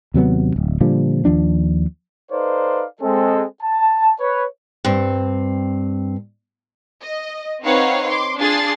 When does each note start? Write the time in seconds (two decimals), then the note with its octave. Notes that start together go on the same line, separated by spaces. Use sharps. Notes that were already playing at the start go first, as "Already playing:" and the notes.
0.14 D#2 C3 F#3 B3
0.56 D1
0.81 A#2 D3 F3 G3
1.25 D#2 F3 D4
2.31 D#4 A4 B4 C5 D5 F5
3.01 G#3 C4 A4
3.62 A5
4.20 B4 C#5
4.85 G2 C4
7.02 D#5
7.62 C4 D#4 B4 C#5 F5 F#5
8.07 C6 D6
8.39 D4 F4 G#4 A6 C7